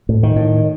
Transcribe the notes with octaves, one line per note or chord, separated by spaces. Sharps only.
A2
D#3
A2